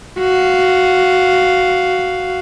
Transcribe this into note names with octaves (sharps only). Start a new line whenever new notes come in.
F#4 F5